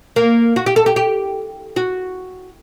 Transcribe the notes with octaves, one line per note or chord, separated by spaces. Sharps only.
A#3
F#4
G4
A4
G4
G4
F#4